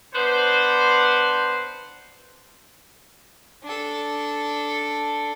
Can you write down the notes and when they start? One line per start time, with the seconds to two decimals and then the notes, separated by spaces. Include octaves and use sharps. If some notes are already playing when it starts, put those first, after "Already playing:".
0.15 B3 D4 B4 C5
3.63 D4 A4